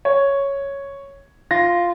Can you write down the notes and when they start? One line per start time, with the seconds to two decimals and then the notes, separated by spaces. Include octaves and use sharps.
0.05 C#5
1.51 F4 A#6